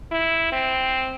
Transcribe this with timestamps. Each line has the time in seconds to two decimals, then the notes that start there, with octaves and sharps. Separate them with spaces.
0.12 E4
0.52 C4